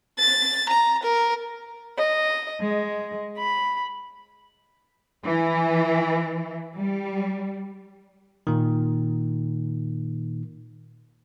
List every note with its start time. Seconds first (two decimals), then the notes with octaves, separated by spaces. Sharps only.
0.19 A6
0.69 A#5
1.03 A#4
1.97 D#5
2.62 G#3
3.37 B5
5.25 E3
6.76 G3
8.47 A#2 D#3